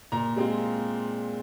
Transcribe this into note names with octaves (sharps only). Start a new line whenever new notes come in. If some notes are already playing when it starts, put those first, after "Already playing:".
A#2 A#5
G#3 C4 F4